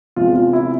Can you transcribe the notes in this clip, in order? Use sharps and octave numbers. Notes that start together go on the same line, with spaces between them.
E2 C3 E3 G#3 F4
F4
E4